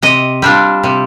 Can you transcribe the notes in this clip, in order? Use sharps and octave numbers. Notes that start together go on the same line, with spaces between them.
C3 D#5
G3 D4 F4
C3